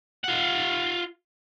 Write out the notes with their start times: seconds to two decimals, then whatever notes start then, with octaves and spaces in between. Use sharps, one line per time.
0.24 F4 F#5